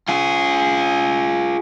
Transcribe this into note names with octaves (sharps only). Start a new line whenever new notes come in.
F4 G#4